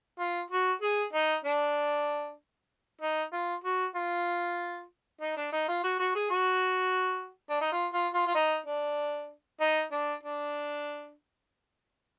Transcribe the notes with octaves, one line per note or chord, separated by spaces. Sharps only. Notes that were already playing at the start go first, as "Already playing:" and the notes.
F4
F#4
G#4
D#4
D4
D#4
F4
F#4
F4
D#4
D4
D#4
F4
F#4
F#4
G#4
F#4
D4
D#4
F4
F4
F4
F4
D#4
D4
D#4
D4
D4